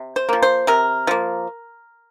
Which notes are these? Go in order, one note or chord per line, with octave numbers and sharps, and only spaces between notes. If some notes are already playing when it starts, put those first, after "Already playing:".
Already playing: C3
C5
F3 A#3
C5
C3 A#4
F3 A#3